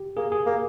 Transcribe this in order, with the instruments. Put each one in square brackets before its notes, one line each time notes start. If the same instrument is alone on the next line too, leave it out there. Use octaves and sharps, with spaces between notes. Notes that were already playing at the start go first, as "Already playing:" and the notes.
Already playing: [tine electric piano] G4
[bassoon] A#3 [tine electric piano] G#4
[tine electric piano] G#4
[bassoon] A#3